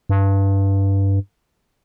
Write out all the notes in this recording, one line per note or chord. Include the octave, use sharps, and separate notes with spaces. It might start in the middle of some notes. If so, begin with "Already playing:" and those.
G2